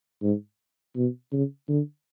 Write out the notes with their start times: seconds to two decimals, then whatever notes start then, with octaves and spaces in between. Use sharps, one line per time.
0.22 G#2
0.96 B2
1.32 C#3
1.69 D3